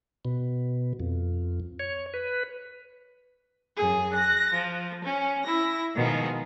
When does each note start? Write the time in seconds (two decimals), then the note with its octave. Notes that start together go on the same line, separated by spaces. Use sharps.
0.25 B2
1.00 F2
1.80 C#5
2.14 B4
3.77 F#2 G#4
4.13 F#6 A#6
4.52 F3
5.04 C#4
5.43 E4 A#6
5.95 B2 D#3 F3 G#3